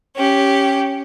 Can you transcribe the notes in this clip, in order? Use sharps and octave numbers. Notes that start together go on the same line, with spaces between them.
C#4 G4